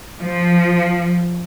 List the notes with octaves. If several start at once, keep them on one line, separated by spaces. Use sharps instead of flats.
F3